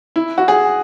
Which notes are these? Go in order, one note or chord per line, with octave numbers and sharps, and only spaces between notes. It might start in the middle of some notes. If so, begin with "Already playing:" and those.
E4
F#4
G#4